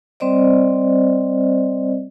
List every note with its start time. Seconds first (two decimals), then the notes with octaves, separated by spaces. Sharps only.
0.20 G3 C4 C5 D5 D#5